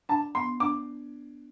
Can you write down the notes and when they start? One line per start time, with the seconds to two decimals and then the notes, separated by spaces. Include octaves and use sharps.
0.09 D4 A5
0.35 B3 C6
0.60 D4 D6